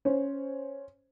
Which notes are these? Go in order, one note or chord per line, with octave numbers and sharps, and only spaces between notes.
C#4 C5